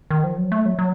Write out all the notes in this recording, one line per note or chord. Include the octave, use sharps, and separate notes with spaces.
D#3
F3
F#3
A3
F#3
F#3